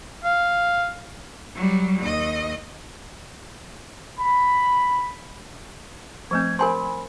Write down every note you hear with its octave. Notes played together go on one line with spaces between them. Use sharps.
F5
F#3 G3
D#2 D#5
B5
F3 A3 C4 G#6
A#4 C5 G#5 B5 C6